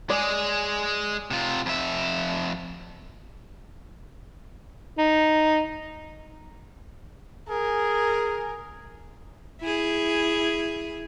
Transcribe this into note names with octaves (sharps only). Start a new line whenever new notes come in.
G#3 G#4 D5
C3 F4
F2 E5
D#4
G#4 A#4
E4 G#4